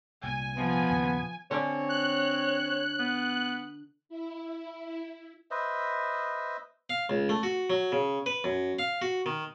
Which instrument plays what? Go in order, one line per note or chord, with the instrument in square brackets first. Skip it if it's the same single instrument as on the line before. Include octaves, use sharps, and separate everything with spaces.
[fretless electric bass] C2 A#2 [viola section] G#5
[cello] F3 [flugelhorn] B3
[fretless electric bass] D#2 A#2 C#3
[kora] D3 C#4 D5 [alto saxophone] C4 [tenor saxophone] C#5
[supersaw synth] F#6
[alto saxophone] B3
[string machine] E4
[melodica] B4 C5 D#5 E5
[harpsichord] F5
C#2
A3
F#4
F#3
C#3
B4
F#2
F5
F#4
D#3